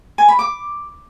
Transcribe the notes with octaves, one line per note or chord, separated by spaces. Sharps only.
G#5
B5
D6